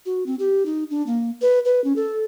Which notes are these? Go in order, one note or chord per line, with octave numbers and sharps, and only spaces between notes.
F#4
C4
G4
D#4
D4
A#3
B4
B4
C#4
A4